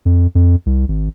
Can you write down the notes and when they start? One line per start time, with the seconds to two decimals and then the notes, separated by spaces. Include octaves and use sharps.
0.05 F2
0.35 F2
0.66 C2
0.88 G#1